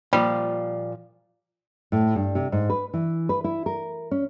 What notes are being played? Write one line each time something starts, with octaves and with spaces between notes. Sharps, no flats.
A#2 F3 G3
A2
G2
C3
G#2
B4
E3
B4
E4
A#4
C#4